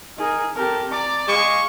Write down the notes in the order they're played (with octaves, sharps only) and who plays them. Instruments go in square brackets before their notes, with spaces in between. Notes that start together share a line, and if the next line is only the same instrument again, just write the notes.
[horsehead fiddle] D#4 [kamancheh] G#4 A#4
[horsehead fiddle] C4 A4 [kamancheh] G4 A#4
[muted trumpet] D5 [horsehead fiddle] A#5 [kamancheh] D6
[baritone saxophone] G#3 [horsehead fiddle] F5 [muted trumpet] C#6